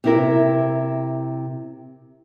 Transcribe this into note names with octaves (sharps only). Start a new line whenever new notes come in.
C3 E4 A#4